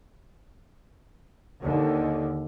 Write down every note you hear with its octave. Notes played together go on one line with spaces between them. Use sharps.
D#2 D3